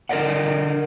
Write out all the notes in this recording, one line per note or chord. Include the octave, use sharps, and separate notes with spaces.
D3 A#4 C5 D5 D#5 F#5